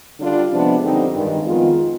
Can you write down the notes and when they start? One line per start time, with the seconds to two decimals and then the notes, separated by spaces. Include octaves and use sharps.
0.19 D3 G3 D4 F4
0.50 C3 F3 G#3 B3 D4
0.82 F2 D3 G3 C4 D#4
1.13 G2 D#3 G#3
1.44 F2 D#3 G#3 B3 F4